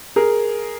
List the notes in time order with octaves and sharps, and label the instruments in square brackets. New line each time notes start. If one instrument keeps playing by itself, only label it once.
[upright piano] G#4 A#4